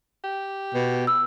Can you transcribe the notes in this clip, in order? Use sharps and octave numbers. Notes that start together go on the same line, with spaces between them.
G4
B2
B4 E6